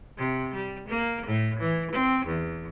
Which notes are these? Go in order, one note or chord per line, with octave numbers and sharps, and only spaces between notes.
C3
G3
A#3
A2
E3
C4
E2